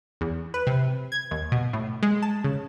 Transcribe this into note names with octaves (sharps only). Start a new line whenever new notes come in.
E2
B4
C3
G#6
D#2
B2
A2
G#3
A5
C#3